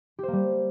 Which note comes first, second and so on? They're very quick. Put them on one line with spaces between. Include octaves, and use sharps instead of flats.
G4 C5 A#3 G3